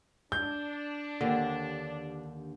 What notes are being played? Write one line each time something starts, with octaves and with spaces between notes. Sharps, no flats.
D4 G6
D#2 D3 G4